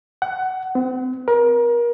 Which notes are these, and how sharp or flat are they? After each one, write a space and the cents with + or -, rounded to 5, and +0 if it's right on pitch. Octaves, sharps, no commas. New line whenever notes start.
F#5 +20
C4 -35
A#4 +30